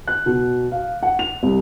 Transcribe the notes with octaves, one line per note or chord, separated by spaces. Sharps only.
F#6
B2
F5
F#5
F7
C2